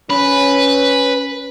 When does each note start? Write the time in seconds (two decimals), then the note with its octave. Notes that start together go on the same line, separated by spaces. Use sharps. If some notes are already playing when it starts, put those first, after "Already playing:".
0.10 C#4 B4